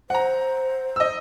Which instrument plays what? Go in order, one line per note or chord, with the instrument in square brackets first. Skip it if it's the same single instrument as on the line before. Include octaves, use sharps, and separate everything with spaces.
[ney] C5 [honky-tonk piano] F#5 A#5
[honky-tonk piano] D#5 E6